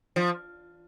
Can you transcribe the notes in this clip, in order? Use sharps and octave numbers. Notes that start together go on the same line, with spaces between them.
F3